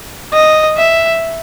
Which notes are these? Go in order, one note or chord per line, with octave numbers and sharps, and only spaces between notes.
D#5
E5